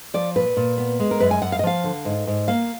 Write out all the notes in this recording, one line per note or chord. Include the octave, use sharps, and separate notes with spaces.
F3 D5
A#2 B4
A#2
B3
G#3
A#4
F#2 B4
G#5
F#2 F#5
F5
D#5
F3 F5
D3
G#2
G#2
A#3 F5